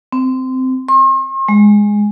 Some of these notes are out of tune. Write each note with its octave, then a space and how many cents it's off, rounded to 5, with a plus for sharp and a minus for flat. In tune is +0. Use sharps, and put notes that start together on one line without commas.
C4 -15
C6 +45
G#3 -5